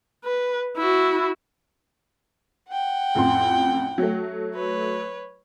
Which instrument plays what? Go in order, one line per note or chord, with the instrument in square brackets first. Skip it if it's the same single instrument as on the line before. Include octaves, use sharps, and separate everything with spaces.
[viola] B4
E4 F#4
[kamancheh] F#5 G5
[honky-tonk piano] A1 F2 C6
F#3 A3
[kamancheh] B4 C#5